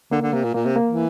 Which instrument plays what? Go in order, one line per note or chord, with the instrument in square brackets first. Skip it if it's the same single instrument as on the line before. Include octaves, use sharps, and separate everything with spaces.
[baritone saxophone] D3 [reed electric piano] A#3
[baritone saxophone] D3
[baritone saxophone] C3 [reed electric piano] A#3
[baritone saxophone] A#2
[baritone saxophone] A#2 [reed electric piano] A#3
[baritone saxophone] C3
[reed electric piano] A#3
[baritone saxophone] E3